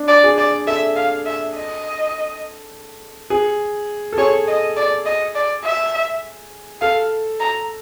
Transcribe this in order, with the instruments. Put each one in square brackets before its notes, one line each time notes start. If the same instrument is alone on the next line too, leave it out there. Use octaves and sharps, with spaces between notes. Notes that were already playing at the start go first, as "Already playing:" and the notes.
Already playing: [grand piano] D4
[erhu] D5
[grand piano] G#4
[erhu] D5
[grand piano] A4 [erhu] E5
[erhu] F5
E5
D#5
[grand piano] G#4
A4
[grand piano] G#4 [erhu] C#5
[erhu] D#5
D5
D#5
D5
E5
[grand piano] A4 [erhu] F5
[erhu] A#5